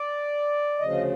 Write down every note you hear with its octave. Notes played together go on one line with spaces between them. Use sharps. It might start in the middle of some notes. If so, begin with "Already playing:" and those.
Already playing: D5
D2 C#3 F3 D#5